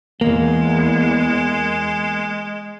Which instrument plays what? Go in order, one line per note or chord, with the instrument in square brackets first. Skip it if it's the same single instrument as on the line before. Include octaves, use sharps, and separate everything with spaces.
[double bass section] E2 [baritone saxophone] G#3 [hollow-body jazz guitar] A#3